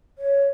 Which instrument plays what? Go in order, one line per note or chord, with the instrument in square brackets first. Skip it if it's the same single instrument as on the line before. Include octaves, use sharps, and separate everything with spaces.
[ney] C#5